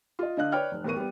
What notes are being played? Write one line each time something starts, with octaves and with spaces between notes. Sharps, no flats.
F4 D#5
D3 D4 D#5 F5 F#6
B4 C#5 D5 G5 F6
F1
E2 A2 B3 A#4 C#6 D#7
G3 B3